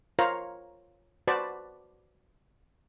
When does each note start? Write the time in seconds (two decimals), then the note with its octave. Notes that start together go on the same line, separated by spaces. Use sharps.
0.19 F4 A#4 C5 C#5 F5 A#5
1.27 F#4 B4 C5 D5 A5 B5